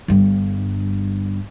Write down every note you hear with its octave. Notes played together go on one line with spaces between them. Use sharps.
G1 G2